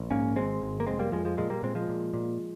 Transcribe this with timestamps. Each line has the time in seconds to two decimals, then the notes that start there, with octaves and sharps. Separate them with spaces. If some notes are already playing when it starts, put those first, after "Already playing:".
Already playing: A#1
0.11 G#2 A#3 C#4
0.36 G#1 G#3 C4
0.62 G#1
0.80 A#3
0.86 F1 G#3 C4
0.99 G3 A#3
1.12 F2 F3 G#3
1.25 F3 G#3
1.37 A#2 F3 G#3
1.50 G3 A#3
1.63 A#2 G#3 C4
1.75 F3 G#3
1.89 A#2
2.14 A#2